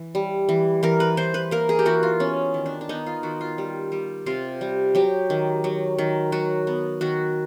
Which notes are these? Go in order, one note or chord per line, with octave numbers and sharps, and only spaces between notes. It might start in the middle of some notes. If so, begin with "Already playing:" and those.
Already playing: E3
G3
E3
E3 A#4
B4
E3 C5
B4
A#3 A#4
G#4
G4
E3 F#4
F4
B3 C#4
D#3
D4
D4
B3 D#4
F4
D#3 F#4
F4
G3
G3
C3 F4
G3
F#3 G4
D#3
F#3
D#3
F#3 F#4
B3
D#3 F#4